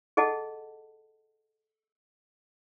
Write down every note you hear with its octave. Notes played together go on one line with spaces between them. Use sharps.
G#4 A4 D#5 F#5 A5